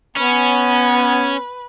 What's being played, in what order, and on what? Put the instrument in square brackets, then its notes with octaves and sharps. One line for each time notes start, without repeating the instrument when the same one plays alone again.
[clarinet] B3 [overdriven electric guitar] C#4 [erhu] B4